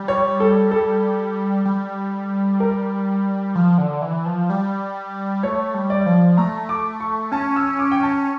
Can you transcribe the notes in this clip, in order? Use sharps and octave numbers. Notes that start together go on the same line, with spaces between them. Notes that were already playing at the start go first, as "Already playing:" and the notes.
Already playing: G3
C#5
A4
A4
G3
A#4
F3
D3
E3
F3
G3
A3 C#5
G3
D5
F3
A3 A#5
D6
C#6
C#4 A5
E6
D6
G5
A5